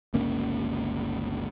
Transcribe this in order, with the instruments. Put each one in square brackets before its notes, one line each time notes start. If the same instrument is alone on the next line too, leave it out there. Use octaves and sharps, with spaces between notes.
[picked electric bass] G1 C#2 A#3 C#4